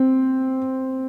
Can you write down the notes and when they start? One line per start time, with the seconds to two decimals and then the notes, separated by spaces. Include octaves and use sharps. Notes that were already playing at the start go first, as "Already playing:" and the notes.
Already playing: C4